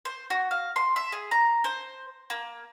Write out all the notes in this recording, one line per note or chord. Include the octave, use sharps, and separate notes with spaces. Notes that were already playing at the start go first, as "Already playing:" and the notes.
C5
F#4
F5
C6
E5
G#4
A#5
C5
A#3